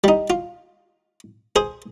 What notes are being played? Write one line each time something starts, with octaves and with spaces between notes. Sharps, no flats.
G3 D#4
F4
G#4 C5